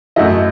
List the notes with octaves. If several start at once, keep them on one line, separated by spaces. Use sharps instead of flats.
F#2 F#3 A3 E4 D#5